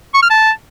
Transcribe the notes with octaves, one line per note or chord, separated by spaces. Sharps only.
C#6
F6
A5